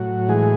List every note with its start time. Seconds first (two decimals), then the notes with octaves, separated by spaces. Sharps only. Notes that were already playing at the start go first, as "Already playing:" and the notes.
Already playing: A2 F#3 F#4
0.29 E3 G#3 G#4